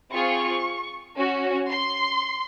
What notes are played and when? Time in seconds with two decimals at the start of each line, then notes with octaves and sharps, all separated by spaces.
0.12 C4 F4 G#4 C#6
1.16 C#4 F#4
1.69 C6